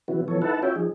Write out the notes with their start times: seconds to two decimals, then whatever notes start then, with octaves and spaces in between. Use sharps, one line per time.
0.08 C#3 E3 F#3 B3 E4 F#4
0.28 E3 F3 B3 A4 C#5
0.42 D#4 E4 A4 B4 F#5 A5
0.63 C#4 F4 F#4 C#5 E5 G5
0.76 F3 D#4 G#4